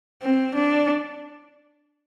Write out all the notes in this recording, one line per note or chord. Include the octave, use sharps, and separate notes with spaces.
C4
D4